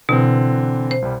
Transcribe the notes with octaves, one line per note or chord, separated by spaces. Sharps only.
B2 D3 E3 C4
C5
C2 G3